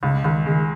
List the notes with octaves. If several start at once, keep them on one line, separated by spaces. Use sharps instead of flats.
C#2 C#3
C#2 D#3
D#3 G#3